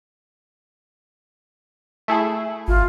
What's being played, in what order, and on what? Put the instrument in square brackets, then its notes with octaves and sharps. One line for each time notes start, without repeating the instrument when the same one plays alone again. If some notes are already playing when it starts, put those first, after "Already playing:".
[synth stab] A3 E4 G#4
[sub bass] G#1 [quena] F4